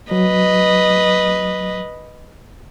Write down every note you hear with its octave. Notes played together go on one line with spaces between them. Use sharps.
F#3 B4 D#5